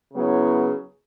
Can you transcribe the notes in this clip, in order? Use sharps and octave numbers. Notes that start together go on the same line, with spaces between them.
C#3 F#3 B3 E4